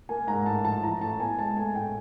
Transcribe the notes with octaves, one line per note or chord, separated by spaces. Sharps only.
A#3 G#5
G#2 A#5
A2 A5
F3 A5
E3 A#5
A2 A5
B3 G#5
G#3 A5
A3 G#5
A2 G5